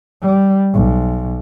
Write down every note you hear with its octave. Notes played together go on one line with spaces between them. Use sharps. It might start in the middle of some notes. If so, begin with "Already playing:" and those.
G3
B1